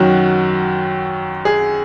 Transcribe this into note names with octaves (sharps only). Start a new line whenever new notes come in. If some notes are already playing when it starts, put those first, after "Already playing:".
Already playing: F#2 D#3 F#3 F#4
G#4